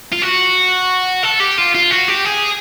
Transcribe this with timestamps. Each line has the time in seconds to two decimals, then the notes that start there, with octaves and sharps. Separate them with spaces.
0.12 F4
0.22 F#4
1.23 A4
1.40 G4
1.58 F4
1.74 F4
1.90 F#4
2.08 G4
2.25 G#4